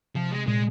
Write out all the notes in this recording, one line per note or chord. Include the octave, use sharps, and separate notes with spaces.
C3 F3
G#3
A#2 G#3